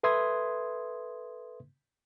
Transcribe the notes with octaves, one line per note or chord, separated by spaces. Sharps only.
A4 B4 E5 C6 D#6 G#6